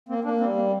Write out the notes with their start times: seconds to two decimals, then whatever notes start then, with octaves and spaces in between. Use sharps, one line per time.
0.09 A#3 C4
0.24 A#3 D4
0.40 G3 C4
0.55 A#3